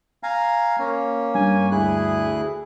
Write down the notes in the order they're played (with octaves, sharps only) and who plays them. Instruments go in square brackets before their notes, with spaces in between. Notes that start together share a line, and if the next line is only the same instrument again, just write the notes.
[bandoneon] F5 G#5 A#5
A#3 C#4
[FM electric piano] G2 [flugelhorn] G#5
[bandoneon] D2 E4 F#6 [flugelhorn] G#4